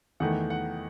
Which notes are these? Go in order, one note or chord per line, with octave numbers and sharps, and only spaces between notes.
E2 D#3 A3 F#5
F#5